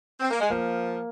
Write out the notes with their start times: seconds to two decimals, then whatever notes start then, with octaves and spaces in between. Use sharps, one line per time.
0.20 C4
0.30 A#3
0.40 G#3
0.50 F3 A#3